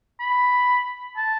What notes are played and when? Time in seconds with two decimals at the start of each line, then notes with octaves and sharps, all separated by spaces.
0.20 B5
1.17 A5